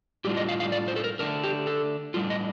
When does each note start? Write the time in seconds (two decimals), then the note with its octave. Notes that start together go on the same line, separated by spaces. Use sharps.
0.24 A2 G3 D4 F4 G4
0.37 D#5
0.49 F5
0.60 F5
0.72 D5
0.88 C5
0.96 A4
1.04 A#4
1.19 D3 A3 D4 A#4
1.44 G4
1.67 A4
2.14 A2 G3 D4 F4
2.30 D#5